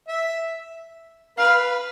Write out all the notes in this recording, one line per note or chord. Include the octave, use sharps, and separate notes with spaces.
E5
B4 F5